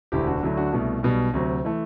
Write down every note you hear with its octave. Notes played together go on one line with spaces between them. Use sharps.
E1 D2 D3 E4 G4
D4 F#4
D2 D3 F#3 A3 E4
D4 F#4
C2 B2 A3
B1 B2 G3
D2 C3 F#3
E3 A3